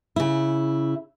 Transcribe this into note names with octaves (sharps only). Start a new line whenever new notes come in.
C#3 E4